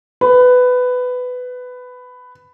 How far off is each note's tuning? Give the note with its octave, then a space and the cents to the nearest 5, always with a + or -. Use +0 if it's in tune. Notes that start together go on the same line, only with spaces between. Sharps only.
B4 +15